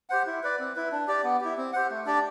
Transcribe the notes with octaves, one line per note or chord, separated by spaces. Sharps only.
G4 C5 F#5
E4
B4 D5
C4
E4 B4
D4
G4 D5
B3
E4 G4
C4
G4 C5 F#5
A3
D4 G4 D5